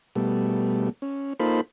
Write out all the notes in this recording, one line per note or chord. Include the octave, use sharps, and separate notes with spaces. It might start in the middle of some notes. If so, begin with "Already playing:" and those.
B2 G3 A3
C#4
A#3 D#4 F4 A4 C5 B5